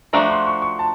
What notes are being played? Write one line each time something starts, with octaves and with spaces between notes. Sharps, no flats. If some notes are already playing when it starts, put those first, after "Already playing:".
F3 A3 D4 F#4 A#5
C6
C#6
C#6
A5